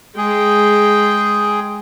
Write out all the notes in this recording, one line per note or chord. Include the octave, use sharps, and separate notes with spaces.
G#3 G#4 G5